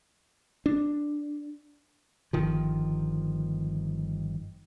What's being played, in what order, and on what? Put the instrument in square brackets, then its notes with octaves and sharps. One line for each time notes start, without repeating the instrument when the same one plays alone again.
[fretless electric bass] D4
[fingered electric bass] G1 D#3 F3